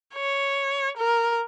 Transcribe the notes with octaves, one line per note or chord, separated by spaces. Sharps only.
C#5
A#4